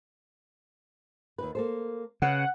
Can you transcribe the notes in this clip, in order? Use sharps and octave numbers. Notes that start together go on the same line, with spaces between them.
D#2 D#4 B4
A#3 A4 C5
C#3 C#4 B4 F#5